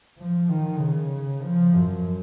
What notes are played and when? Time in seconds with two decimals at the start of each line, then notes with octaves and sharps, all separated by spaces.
0.18 F3
0.50 D#3
0.80 C#3
1.43 F3
1.73 F#2